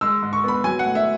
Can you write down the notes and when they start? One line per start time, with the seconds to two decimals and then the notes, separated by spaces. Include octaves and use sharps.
0.01 G#3 E6
0.22 G#2
0.33 C#6
0.43 B3 B5
0.64 F#3 G#5
0.79 F#5
0.85 A2
0.95 E5